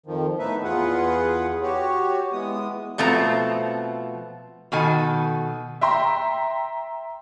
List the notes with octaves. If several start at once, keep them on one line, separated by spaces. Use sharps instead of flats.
F2 D#3 F3
A2 A3 B3 D#4 B4 E5
E2 F4 G#4 B4 F#5
F#4 G4 C#5
E3 G#3 B3 D#6
B2 F3 A3 C4 A#5
B2 D#3 A4 G#5
E5 G5 A#5 C6